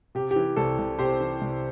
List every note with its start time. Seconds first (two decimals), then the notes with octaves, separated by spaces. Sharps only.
0.15 C3 G4
0.31 G4
0.36 E3
0.56 C2 A4
0.78 C2
0.98 C3 G4 C5
1.20 E3
1.41 C2